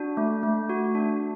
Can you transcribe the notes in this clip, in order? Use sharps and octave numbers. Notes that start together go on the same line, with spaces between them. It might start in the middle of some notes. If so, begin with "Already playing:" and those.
Already playing: D4 F#4
A3
A3
F#4
D4